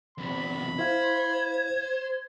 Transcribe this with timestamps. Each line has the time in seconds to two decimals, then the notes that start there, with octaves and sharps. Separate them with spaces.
0.18 E2 C3 B5
0.79 E4 C5 F5 G#6